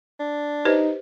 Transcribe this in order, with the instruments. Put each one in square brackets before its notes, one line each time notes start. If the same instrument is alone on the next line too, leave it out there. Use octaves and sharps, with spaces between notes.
[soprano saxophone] D4
[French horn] D#4 [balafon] G4 B4 C5